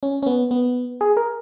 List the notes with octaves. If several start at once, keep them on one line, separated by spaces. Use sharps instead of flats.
C#4
C#4
B3
B3
G#4
A#4